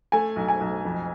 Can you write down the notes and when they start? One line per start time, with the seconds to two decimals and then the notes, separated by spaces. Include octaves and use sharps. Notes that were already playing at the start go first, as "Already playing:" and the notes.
0.12 A3 G#5
0.36 B1
0.49 G#5
0.60 B1
0.84 F2